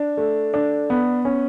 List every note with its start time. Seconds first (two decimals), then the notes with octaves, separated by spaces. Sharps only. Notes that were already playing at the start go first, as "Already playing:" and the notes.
Already playing: D4
0.17 A3
0.54 D4
0.90 B3
1.25 C#4